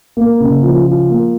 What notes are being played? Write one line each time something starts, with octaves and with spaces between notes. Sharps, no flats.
A#3
C#3
F3
F4
A#3